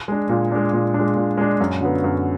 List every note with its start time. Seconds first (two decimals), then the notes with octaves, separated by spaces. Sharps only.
0.08 G#3 D4
0.29 A#2
0.52 G#3 D4
0.73 A#2
0.94 D4
0.99 G#3
1.16 A#2
1.37 G#3 D4
1.60 F#2
1.81 D3 F#3 B3
2.04 F#2